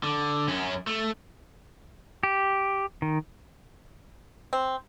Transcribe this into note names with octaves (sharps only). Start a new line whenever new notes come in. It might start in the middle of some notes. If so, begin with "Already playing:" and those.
D3
F#2 C#4
A3
G4
D#3
C4